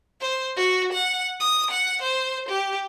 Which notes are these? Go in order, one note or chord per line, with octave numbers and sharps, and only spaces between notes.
C5
F#4
F#5
D#6
F#5
C5
G4